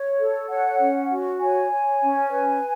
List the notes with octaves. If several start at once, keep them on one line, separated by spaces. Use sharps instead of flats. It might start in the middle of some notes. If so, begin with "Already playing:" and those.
Already playing: C#5
A4
C#5 F#5
C#4
F#4
C#5 G#5
C#5
C#4
B4